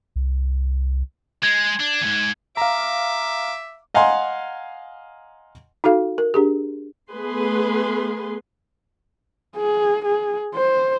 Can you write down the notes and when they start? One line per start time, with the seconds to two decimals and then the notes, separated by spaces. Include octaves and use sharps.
0.16 C2
1.43 G#3 G#6
1.80 D4
2.01 D#2 G#2
2.57 E5 F5 A#5 D6
3.94 D#5 F5 F#5 G#5 A#5 C6
5.84 D#4 F#4 A4 F5
6.18 A#4
6.34 D4 G4 G#4
7.12 A3 B3 G#4 B4 C6
9.57 G#4
10.05 G#4
10.54 C5